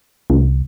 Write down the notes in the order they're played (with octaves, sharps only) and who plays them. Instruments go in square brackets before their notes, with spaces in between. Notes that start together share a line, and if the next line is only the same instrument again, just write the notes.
[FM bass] C2